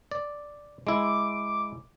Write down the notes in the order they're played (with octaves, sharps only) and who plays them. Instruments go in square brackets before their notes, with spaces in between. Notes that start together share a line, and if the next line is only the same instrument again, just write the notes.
[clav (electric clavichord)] D5
[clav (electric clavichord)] G#3 E4 [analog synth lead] D6